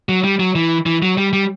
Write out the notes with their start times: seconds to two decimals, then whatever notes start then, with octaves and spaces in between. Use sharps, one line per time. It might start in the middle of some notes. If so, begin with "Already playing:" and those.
0.09 F#3
0.24 G3
0.40 F#3
0.55 E3
0.86 E3
1.03 F#3
1.17 G3
1.33 G3